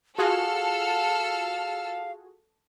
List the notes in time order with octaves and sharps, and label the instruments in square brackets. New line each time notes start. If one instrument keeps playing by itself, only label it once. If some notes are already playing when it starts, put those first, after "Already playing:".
[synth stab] F4 F#4 G#4 [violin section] A4 E6 F6 [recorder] F5